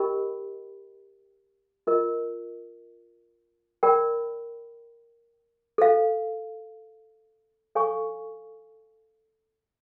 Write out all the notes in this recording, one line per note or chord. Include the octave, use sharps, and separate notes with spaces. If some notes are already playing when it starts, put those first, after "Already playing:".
Already playing: G4 A#4 D#5 G5 B5
F4 A#4 D#5
A#4 D5 G5 B5
A4 C5 F5
A4 C#5 F5 G#5 C#6